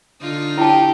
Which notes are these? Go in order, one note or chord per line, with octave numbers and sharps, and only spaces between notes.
D3 D#4 F4
E4 G4 A5